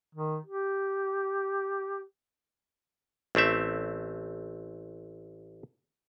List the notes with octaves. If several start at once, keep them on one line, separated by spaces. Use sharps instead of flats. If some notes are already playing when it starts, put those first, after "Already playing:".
D#3
G4
A1 A3 C4 E5